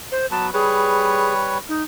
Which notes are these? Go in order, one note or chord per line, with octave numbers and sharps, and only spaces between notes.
C5
F#3 B3 B4 A5
G3 G#4 B4 C#5
D#4